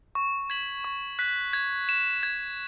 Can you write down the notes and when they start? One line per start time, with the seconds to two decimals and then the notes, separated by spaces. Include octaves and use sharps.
0.15 C#6
0.50 G#6 B6 F#7
0.85 C#6
1.19 F#6 B6
1.53 G#6
1.89 E7
2.23 G#6